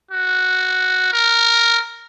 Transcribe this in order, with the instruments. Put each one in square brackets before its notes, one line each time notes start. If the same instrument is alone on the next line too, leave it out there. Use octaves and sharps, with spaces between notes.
[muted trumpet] F#4
A#4